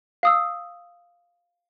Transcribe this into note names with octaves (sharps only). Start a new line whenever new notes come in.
F5 D#6 E6